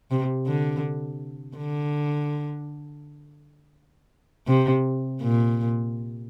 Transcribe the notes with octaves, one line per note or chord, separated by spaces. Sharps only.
C3
D3
D3
C3
A#2